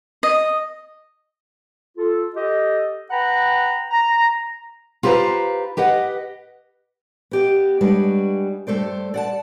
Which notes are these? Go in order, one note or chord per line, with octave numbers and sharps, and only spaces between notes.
D#5
F4 A4
G4 A4 D#5
B4 F#5 G5 A#5 B5
A#5
F4 G4 B4 C5 F5 A#5
G4 B4 D#5 F#5
B3 G4 D#5
G3 G#3 D4 F#4 B4 C#5
G2 A3 A4 C5 D5
D5 F#5 A5